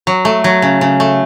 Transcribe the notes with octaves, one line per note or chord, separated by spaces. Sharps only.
F#3
A3
F#3
C#3
C#3
A3